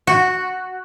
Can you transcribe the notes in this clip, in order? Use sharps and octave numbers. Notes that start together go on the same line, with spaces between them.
F#4